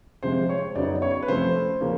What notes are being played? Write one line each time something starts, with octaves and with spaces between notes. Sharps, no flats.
C3 F3 G#3 C5
C#5
F#2 C#3 F#3 B3 D#4 D5
C#5
B4
C3 F3 A3 C#4 C5
C#3 F3 A#3 C#4